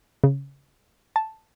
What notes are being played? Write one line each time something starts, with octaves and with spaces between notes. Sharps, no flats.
C#3
A5